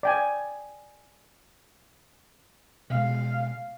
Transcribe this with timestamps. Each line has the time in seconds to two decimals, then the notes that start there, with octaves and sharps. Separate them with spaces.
0.03 D5 G5 G#5
2.90 B2 G#3 F5